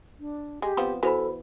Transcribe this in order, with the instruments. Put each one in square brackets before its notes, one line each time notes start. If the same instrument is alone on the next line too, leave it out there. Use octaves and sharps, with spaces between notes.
[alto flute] D4
[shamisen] G#3 [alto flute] G4
[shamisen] F3 B3 C4
[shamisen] E3 B3 [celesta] F#4 C5 B5 [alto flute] A4